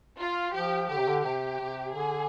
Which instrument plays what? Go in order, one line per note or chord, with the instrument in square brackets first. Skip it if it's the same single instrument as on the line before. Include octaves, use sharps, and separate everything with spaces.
[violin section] F4
[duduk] F3 [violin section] G4
[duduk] D3 [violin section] G4
[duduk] C3
D3
[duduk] C3 [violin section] G4
[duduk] C3
[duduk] D3 [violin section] G#4